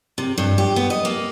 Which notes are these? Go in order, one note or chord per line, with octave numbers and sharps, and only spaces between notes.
C3
G2
G4
B3
D#5
A#3